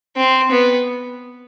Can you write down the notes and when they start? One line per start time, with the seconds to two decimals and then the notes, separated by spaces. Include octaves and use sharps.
0.17 C4
0.51 B3